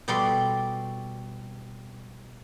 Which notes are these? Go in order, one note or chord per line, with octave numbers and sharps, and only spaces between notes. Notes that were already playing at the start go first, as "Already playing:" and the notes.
B2 G3 A4 D5 B5 C6